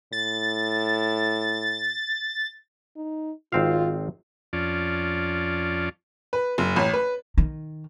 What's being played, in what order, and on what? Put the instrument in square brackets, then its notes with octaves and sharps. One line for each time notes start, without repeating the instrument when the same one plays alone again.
[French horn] A2 [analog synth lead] A6
[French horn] D#4
[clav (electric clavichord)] G#1 C4 F5 [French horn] F4
[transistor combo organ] F2 C#4 F4 D5 A5
[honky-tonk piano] B4
F#1
A1
B4
[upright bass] D#3